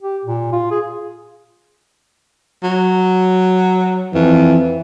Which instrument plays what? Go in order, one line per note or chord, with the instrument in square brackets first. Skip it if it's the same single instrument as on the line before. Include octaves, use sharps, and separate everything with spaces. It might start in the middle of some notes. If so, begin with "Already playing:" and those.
[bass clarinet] G4
A#2
F4
G#4
[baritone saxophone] F#3
[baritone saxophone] F2 [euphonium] E3